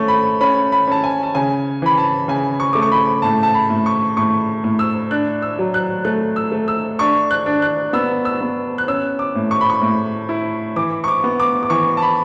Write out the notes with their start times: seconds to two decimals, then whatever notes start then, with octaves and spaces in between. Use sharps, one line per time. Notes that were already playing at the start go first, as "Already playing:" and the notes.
Already playing: A3 C#4 C#6
0.08 B5
0.41 C#4 B5
0.72 B5
0.87 C#4 A5
1.04 G#5
1.23 A5
1.35 C#3 G#5
1.82 E3 B5
1.97 A5
2.28 C#3 G#5
2.60 C#6
2.73 A3 D6
2.82 C#6
2.92 B5
3.22 A2 A5
3.43 A5
3.54 B5
3.70 A2
3.86 C#6
4.17 A2 C#6
4.64 A2
4.79 E6
5.11 D4 F#6
5.42 E6
5.59 F#3
5.74 F#6
6.05 A3 F#6
6.36 E6
6.52 A3
6.68 E6
6.99 D4 C#6
7.31 F#6
7.46 D4
7.62 F#6
7.93 B3 E6
8.25 E6
8.41 B3
8.78 F#6
8.88 C#4 E6
9.19 D6
9.35 A2
9.51 C#6
9.61 B5
9.70 C#6
9.82 A2
10.29 E4
10.76 E3 D6
11.04 C#6
11.08 D6
11.24 B3
11.40 D6
11.63 D6
11.70 E3 C#6
11.97 A5
12.02 B5